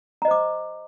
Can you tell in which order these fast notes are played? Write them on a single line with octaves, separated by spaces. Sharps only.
A#5 D#5 C5 D6